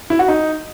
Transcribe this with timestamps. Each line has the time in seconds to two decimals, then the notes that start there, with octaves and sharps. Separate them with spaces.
0.10 E4
0.19 F#4
0.28 D#4